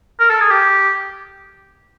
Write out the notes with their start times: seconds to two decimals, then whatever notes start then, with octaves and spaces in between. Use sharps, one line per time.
0.20 A#4
0.30 A4
0.40 G#4
0.50 G4